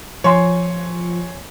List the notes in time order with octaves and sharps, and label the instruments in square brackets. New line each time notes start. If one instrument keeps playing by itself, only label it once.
[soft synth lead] F3 [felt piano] C#5 G#5 C6